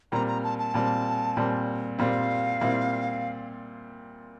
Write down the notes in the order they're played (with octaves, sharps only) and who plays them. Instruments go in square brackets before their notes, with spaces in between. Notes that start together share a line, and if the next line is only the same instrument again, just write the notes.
[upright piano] A#2 G3 C4 [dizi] A#5
[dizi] A#5
A5
A5
[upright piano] A#2 G3 C4
A#2 G3 C4
[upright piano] A#2 G3 C4 [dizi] F5
[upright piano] A#2 G3 C4 E4